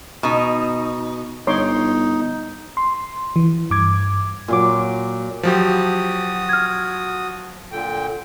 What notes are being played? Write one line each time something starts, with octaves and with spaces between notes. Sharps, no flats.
B2 D#4
G1 D#4 C#5 C6 D6
C6
E3
G2 D6 G#6
A#2 F#3 D6
F3 F#3 F#4 G4 D#6
F6 G#6
A#2 D3 G5